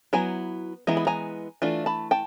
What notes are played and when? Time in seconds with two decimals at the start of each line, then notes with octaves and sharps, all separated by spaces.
0.13 F#3 B3 E4 G#5 A#5
0.87 E3 G#3 B3 E4 A#5
0.97 B5
1.07 G#5 A#5
1.62 E3 A3 D4 F4
1.86 A5 B5
2.11 G5 A5